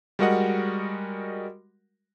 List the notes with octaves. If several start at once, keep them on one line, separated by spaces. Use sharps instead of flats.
G3 G#3 F#4 A#4 D#5 F#5